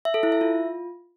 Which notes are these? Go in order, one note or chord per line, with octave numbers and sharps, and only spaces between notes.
E5
A4
E4
E5
F4